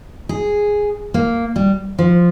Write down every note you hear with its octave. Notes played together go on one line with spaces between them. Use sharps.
G#4
A#3
G3
F3